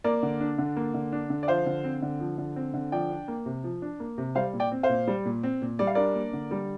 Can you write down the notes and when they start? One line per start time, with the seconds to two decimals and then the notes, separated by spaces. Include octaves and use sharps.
0.04 A#3 A#4 D5
0.23 D3
0.41 D4
0.58 D3
0.77 A#3
0.94 D3
1.13 D4
1.30 D3
1.43 D5
1.48 F3 C5 F5
1.66 D3
1.84 C4
2.02 D3
2.20 F3
2.38 D3
2.56 C4
2.74 D3
2.92 F3 D5 G5
3.10 D4
3.28 A#3
3.46 C3
3.64 F3
3.82 D4
4.00 A#3
4.18 C3
4.35 G3 C5 F5
4.53 A#2
4.60 D5 G5
4.72 C4
4.83 C5 F5
4.89 A#2
5.07 G3
5.25 A#2
5.43 C4
5.62 A#2
5.79 G3 D5
5.87 F5
5.95 D4 A#4 D5
6.15 A#3
6.33 D3
6.51 G3